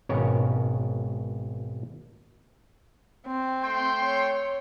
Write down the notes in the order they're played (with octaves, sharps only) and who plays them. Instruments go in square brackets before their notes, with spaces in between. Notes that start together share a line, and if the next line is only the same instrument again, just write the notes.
[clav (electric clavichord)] G#1 B2 C#4 A#4 C#5 A#5
[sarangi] C4
[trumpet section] A3 G5 C6
[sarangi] C#5